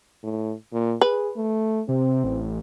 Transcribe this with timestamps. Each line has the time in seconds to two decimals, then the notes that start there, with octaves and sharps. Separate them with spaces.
0.23 A2
0.73 A#2
1.01 G#4 B4
1.36 A3
1.89 C3 C4
2.24 A1